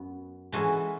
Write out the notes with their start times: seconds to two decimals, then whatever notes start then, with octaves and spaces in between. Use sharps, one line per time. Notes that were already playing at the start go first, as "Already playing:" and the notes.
Already playing: F#2 B3
0.52 E3 G#3 C#4 F#4 A4